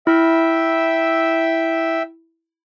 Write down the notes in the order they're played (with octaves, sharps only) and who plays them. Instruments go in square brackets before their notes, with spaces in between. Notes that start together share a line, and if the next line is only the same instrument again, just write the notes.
[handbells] E4 [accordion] E5 G5 E6